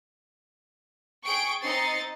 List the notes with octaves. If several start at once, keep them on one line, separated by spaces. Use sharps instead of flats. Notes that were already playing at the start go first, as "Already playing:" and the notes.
G#4 G5 C#6 D7
C4 D#4 D#5 A6 C7 C#7